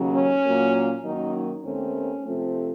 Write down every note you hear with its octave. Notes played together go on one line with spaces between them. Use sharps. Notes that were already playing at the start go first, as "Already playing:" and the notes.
Already playing: D#2 C#3 F#3
C#4
A#2 F#3 A#3
F#2 D#3 F#3 A#3 D#4
D#2 D#3 A3 C4 C#4
C3 F3 A3 C4